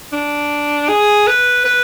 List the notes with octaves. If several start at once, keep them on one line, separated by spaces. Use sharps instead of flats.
D4
G#4
B4
B4